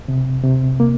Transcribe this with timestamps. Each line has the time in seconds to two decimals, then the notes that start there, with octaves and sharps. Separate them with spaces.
0.08 C3
0.44 C3
0.80 A#3